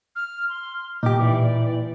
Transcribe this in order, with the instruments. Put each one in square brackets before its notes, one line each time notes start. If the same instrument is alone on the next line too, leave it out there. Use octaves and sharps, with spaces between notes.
[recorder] F6
C6
[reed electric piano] A#2 [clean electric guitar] D#4 G4 [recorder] D6
[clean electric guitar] E3 [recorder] D5